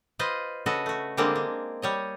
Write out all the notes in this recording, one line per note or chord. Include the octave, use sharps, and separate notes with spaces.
F4 B4 C5 D#5
C#3 F#4 A4 B4 D#5
A3 F#4
D3 G3 G#3 A#3 C4 D4
G#3
G3 C#5 D#5